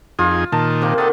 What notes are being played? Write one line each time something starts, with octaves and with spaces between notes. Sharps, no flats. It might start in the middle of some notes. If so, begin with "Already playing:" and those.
F2 D#4 F4 G#4
A#2 D#3 A5
C3 A#3
D#3 D#4 A4 F#5